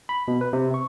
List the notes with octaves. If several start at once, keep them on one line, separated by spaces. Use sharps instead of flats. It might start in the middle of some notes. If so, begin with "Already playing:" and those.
B5
B2
B4
C3
C#6